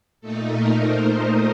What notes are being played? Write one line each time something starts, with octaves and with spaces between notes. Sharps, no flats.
A#2 A3 D#4 A4
A#4
C5
D#5